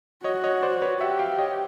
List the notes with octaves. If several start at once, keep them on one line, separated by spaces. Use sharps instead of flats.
F#4 C#5 D#5
C#5 D#5
C5 D5
B4 C#5
G4 E5 F#5
F5 G5
C#5 D#5